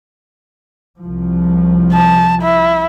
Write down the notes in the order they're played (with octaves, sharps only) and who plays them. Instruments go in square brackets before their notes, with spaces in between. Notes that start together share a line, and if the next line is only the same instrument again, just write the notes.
[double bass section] C2 F3
[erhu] A5
E4